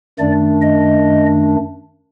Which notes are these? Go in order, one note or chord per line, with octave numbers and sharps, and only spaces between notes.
F#2 D#3 A3 D4 D5
D#5